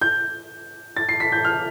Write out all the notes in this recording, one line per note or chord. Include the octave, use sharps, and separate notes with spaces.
G6
A6
C7
B6
G6
F6